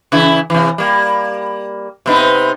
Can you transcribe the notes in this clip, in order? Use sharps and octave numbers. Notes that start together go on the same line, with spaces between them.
C#3 E3 E4
C3 E3
G3 A#3
C3 B3 D#4